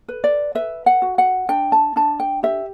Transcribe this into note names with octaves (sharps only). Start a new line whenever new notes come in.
B4
D5
B4 E5
F#5
F#4
F#5
D4 G5
A5
D4 A5
G5
G4 E5